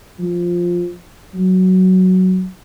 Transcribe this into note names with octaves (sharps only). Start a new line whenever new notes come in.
F3
F#3